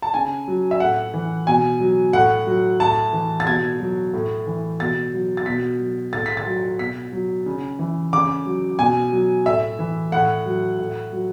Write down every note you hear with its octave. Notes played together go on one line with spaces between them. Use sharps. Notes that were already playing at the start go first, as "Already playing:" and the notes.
A5
C#3 G#5
F#3
E5
A2 F#5
E3
B2 G#5
F#3
A2 F#5
F#3
A2 A5
E3
A6
B2 G#6
F#3
A2
E3
B2 A6
F#3
A6
B2 B6
F#3
A2 A6
B6
A6
F#3
B2 B6
F#3
C#3
E3
C#3 D6
F#3
B2 G#5
F#3
A2 E5
E3
A2 F#5
F#3
A2
F#3